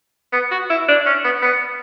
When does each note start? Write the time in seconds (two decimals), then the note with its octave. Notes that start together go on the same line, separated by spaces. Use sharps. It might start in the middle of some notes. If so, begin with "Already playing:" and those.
0.33 B3
0.51 F#4
0.70 E4
0.88 D4
1.06 C#4
1.24 B3
1.42 B3